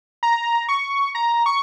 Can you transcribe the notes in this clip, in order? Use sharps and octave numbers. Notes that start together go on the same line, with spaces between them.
A#5
C#6
A#5
C#6